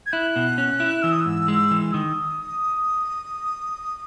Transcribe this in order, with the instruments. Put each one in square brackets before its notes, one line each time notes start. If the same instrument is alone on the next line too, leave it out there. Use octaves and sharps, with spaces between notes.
[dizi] G#6
[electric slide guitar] E4 [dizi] F#6
[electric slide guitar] B2
C#4
E4
[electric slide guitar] E3 [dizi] E6
[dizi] D#6
E6
[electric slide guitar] G#2
G#3
E3
[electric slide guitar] D#3 [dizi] D#6